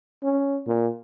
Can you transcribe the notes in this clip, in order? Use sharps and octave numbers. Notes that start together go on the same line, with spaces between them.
C#4
A#2